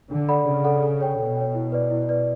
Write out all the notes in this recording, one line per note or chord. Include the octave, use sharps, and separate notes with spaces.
D3 D4
A4 D5 F#5 B5
C#3 D4
A4 D5 F#5 B5
A4
C#5 G5
B2 A4
C#5 G5
E4
B4 D5
E4
B4 D5